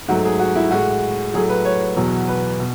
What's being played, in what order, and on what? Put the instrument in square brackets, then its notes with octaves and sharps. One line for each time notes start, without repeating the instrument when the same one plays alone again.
[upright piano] G#2 F#3 A3 F#4
G#4
F#4
E4
A2 G#3 F#4
A2 F#3 A3 G#4
B4
C#5
E2 B2 F#3
B4
B2